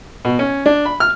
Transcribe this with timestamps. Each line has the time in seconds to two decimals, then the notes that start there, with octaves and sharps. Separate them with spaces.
0.25 B2
0.39 C#4
0.66 D4
0.86 B5
1.00 F6